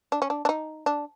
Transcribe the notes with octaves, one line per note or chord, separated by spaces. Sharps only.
D4
C#4
D4
D4
D#4
D4